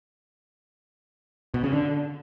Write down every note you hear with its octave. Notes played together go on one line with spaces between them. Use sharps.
B2
C#3
D3